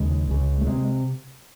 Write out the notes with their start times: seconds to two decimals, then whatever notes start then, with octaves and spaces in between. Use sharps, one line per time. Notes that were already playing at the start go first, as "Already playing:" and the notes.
Already playing: D#2 C#3 G#3
0.28 C#2 C#3
0.61 A3
0.67 C3 G#3